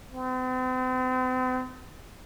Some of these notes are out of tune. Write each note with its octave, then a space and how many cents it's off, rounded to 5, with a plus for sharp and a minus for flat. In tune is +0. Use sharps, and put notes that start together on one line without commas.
C4 -40